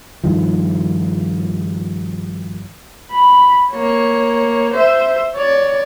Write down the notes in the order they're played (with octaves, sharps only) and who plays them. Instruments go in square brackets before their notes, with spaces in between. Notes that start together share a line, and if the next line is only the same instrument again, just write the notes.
[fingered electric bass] G2 D#3 F3
[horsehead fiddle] B5
A#3 C#5
C5 E5
C#5 D5